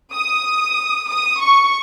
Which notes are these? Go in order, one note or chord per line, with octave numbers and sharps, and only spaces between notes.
D#6
D#6
C#6